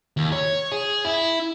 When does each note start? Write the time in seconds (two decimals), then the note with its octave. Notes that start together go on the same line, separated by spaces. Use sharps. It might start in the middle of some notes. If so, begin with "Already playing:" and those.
0.17 D#2
0.32 C#5
0.72 G#4
1.05 E4